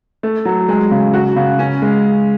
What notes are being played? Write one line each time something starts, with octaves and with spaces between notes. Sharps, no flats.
A3
F#3
G#3
C#3
F#4
C#3
C#4
G#3